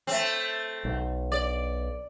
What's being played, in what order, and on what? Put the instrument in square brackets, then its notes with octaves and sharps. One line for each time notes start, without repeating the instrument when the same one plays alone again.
[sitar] A3 C4
[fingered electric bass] B1
[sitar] D5